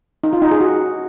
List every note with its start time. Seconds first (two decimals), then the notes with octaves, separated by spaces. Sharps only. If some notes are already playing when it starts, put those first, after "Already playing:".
0.24 D#4
0.33 F4
0.42 D#4
0.51 G#4
0.60 F#4